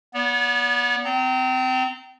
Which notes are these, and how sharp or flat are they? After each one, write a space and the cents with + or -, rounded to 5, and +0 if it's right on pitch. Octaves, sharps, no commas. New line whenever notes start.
B3 -25 D5 -45
C4 -30 A#5 -25